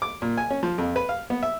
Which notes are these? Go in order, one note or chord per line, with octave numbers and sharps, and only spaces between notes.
D6
A#2
G#5
C#4
F3
F2
B4
F5
B3
E5